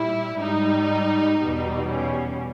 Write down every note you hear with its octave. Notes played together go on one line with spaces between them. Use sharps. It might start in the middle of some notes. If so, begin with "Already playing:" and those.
Already playing: A#2 G3 E4
G#2 G3 D#4
E2 B2 G3
C#4